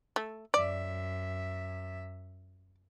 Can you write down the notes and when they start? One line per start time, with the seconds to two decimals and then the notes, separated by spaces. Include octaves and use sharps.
0.16 A3
0.54 F#2 D5 E5